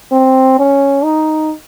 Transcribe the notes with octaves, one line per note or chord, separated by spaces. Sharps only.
C4
C#4
D#4